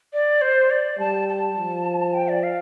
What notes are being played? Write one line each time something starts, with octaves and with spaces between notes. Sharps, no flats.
D5
C5
D5
G3 A5
A5
F3
G5
D5
F5